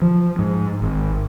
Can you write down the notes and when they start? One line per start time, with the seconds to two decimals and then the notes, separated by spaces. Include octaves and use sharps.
0.02 F3
0.39 G#2
0.82 G#1